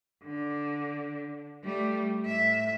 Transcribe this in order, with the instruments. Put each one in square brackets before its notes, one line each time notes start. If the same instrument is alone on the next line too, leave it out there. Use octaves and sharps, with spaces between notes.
[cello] D3
G3 A3
A2 E5